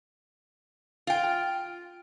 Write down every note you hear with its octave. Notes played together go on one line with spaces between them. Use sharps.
F4 G5